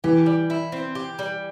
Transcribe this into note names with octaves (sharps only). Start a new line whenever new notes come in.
E3 G4
G3
E4
C4
G4
G3